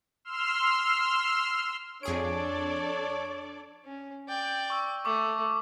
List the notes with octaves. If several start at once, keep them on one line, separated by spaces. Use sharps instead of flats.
C6 E6 F6
F2 D4 G#4 A4 C#5 D5 D7
C#4
D5 G5
C#6 E6
A3 C#6 D6 E6